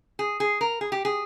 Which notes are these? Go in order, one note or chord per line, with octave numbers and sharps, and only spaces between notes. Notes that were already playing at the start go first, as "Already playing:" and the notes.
G#4
G#4
A#4
G#4
G4
G#4